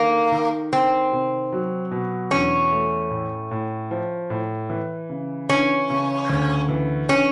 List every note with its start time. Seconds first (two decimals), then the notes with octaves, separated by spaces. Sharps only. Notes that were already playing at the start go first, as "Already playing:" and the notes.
Already playing: D#3 A#3
0.32 D#3
0.73 D#3 C4
1.12 C3
1.53 F#3
1.91 B2
2.31 E2 C#4
2.72 A3
3.11 A2
3.51 A2
3.91 F3
4.30 A2
4.70 E3
5.09 C#3
5.49 E3 C#4
5.90 C#3
6.30 D2
6.69 E3
7.09 C#4